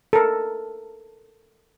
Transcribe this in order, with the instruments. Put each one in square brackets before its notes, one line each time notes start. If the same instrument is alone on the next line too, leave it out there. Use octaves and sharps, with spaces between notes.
[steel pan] A4 A#4